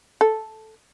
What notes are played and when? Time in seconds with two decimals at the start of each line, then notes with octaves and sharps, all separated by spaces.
0.21 A4